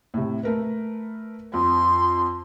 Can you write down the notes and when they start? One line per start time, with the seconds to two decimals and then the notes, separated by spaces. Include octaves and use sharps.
0.14 A2 C3
0.43 A3 A#4 B4
1.54 F2 C6